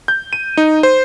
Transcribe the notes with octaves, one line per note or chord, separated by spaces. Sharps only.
G6
D#7
D#4
C5